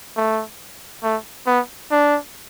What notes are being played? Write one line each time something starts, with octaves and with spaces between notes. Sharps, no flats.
A3
A3
B3
D4